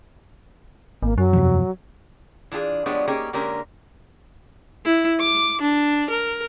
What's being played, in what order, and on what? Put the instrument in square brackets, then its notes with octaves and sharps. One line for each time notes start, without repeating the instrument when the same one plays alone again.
[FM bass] G#1 [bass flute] A#3
[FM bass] F#2 [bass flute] F#3
[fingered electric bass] E2 C3 F3
[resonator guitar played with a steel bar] E3 D4 F4 G4 G#4
F3 G3 G#3 B3 D4 C#5
A#3 C#4 D#4 G4 G#4
D3 G#3 A#3 C#4 G4 A#4
[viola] E4
D6
D4
A#4